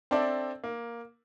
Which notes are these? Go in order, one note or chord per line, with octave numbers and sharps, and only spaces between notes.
C4 D4 A4 D5 E5
A#3